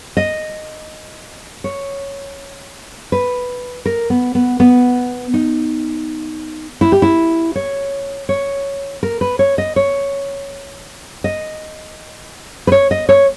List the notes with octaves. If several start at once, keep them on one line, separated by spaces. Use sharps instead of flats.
D#5
C#5
B4
A#4
B3
B3
B3
D#4
E4
G4
E4
C#5
C#5
A#4
B4
C#5
D#5
C#5
D#5
B4
C#5
D#5
C#5